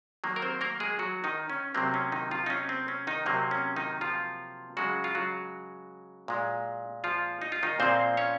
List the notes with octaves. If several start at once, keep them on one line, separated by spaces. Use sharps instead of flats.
D#3 F#3 A#3
A#4
C4 C5
A#3 A#4
G#3 G#4
F#3 F#4
D#3 D#4
C#4
C3 F#3 A#3 C4
C#4
D#3 D#4
F3 F4
D#4
C#4
C4
C#4
D#3 D#4
C3 F#3 A#3 C4
C#4
D#3 D#4
F3 F4
C#3 F#3 G#3 F#4
F4
F#3 F#4
A#2 G#3
F3 F4
D#4
F4
D#3 D#4
A#2 F3 A#3 C4 C5
C#4 C#5